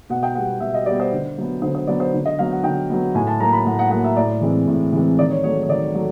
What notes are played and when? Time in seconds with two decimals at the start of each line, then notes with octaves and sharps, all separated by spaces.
0.10 B2 F#5
0.23 G5
0.35 G3 B3 F#5
0.60 B2 E5
0.74 D#5
0.86 G3 B3 D5
1.00 C5
1.12 D3
1.38 F#3 B3
1.62 D3 C5
1.75 C5
1.87 F#3 B3 D5
2.00 C5
2.14 D3
2.25 D#5
2.39 F#3 B3 F5
2.51 F#5
2.64 D3 G5
2.90 F#3 B3
3.15 A2 G#5
3.27 A5
3.40 F#3 A#3 A#5
3.52 B5
3.66 A2 F#5
3.79 F#5
3.91 F#3 A#3 F#5
4.04 E5
4.16 A2 D5
4.41 E3 G#3 C4
4.67 A2
4.92 E3 G#3 C4
5.19 D#3 D5
5.30 C#5
5.44 F#3 A3 C#5
5.63 C#5
5.69 D#3 D5
5.94 F#3 A3